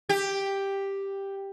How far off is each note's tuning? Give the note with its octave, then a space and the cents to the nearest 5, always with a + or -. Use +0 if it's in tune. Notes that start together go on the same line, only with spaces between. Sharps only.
G4 +5